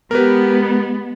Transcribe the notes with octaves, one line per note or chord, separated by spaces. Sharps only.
G#3 B3 G4 A#4 B4